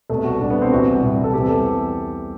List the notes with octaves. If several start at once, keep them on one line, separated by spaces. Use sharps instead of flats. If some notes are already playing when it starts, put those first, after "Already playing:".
C2 B2 G3 A3
F#4
C2 B2 G3 D4
B3
C4
C2 C3 E3 G3 F#4
C2 C3 E3 G3
A4
E2 C3 E3 G3 G4
A4